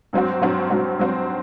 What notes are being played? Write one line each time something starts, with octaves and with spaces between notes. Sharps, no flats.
G2 F#3 C4 F#4
G2 F#3 C4 F#4
G2 F#3 C4 F#4
G2 F#3 C4 F#4